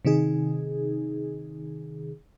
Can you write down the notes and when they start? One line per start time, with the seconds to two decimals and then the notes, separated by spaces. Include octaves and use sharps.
0.05 C3 D#3 D#4 G#4